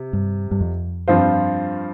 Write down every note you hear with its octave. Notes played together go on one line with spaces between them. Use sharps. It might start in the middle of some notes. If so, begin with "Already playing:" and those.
Already playing: C3
G2
G2
F2
G2 F3 C4 F4 C5